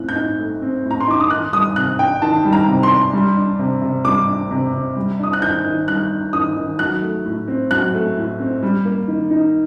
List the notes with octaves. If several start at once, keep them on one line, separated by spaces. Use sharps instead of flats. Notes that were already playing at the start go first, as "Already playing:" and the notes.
Already playing: A2 C4 F#6
G6
D#4
A3
C4
A2
A#5
C6
D#4 D6
D#6
D#3 F#6
G3 D#6
C3 F#6
D4 G5
D#3 A5
G3
A#5
C3
C6
D4
G3
D4
C3
C3
G3 D6
D4
C3
C3
G3
D4 D#6
F#6
D#3 G6
D#3
G3 F#6
D4
D#3 D#6
D#3
F#3 F#6
A3
A2
C4
F#3 F#6
A3
A2
C4
G3
A#3
D#3
D#4